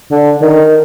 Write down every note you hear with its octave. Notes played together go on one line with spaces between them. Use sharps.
D3
D#3